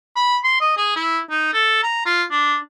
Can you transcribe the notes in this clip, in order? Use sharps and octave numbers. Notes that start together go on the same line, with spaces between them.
B5
C6
D#5
G#4
E4
D#4
A4
A#5
F4
D4